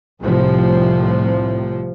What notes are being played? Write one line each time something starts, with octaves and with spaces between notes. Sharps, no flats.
C2 A2 C3 F3